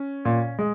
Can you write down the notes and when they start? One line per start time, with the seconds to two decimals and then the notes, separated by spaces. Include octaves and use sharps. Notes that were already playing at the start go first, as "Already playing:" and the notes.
Already playing: C#4
0.25 A#2
0.59 G#3